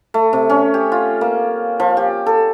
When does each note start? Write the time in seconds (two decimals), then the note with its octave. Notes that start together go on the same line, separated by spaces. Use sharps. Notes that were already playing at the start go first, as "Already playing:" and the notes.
0.14 A3
0.33 C3
0.50 C#4
0.74 G4
0.92 F4
1.21 A#3
1.80 F3
1.97 G4
2.26 A4